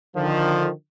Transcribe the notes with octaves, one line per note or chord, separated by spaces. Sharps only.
D3 D#3 F3